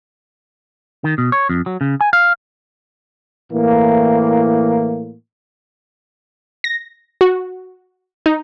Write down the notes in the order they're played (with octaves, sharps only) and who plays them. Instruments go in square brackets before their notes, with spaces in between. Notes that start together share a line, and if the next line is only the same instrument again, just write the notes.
[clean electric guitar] D#3
B2
C#5
F2
F#3
C#3
G#5
F5
[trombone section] A2 E3 A#3
[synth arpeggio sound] A#6
F#4
D#4